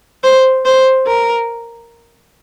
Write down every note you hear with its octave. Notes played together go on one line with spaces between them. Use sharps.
C5
C5
A#4